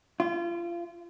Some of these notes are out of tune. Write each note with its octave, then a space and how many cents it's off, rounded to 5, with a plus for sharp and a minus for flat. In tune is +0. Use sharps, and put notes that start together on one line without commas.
F4 -30